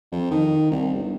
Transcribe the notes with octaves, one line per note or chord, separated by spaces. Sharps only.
F2
D#3
C2
G1